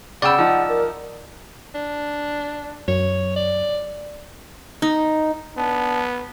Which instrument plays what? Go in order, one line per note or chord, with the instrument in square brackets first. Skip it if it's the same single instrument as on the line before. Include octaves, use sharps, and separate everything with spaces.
[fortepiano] C#3 G5 B5 [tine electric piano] D5 E6 [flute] F#5
[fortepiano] F3 D#4
[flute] A#4
[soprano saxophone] D4
[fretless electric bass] F#2 [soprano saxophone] C#5
[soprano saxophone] D5
[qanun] D#4
[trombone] B3 [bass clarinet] D4